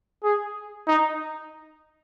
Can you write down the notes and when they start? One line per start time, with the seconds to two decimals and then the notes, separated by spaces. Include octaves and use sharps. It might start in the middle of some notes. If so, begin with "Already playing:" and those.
0.23 G#4
0.87 D#4